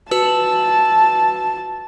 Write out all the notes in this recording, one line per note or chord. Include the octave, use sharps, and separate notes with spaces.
F#4 B4 A5 E6